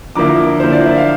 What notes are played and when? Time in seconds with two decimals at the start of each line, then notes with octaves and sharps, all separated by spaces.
0.16 D3 F3 A#3 E4 A#5 D6
0.60 D3 F3 A#3 E4 C5
0.72 D5
0.86 E5
0.98 F5